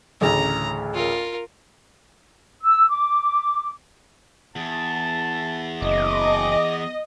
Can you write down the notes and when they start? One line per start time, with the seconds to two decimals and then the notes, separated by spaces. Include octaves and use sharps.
0.21 A1 D2 C#3 A#5
0.94 F4 A#4
2.62 E6
2.89 D6
4.56 E2 A5
5.82 F#1 D#5 D6